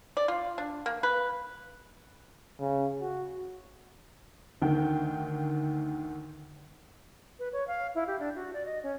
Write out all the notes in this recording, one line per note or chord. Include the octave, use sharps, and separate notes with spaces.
D5
F4
D4
A#3
B4
C#3
F#4
D2 D#3 G5
B4
C#5
F5
E4
G4
D4
F#4
D5
D#5
C#4